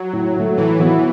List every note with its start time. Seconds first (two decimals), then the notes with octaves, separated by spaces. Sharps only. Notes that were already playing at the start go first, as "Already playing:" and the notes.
Already playing: F#3
0.13 A2
0.36 F#3 A3
0.57 A2 E3
0.79 E3 B3 F#4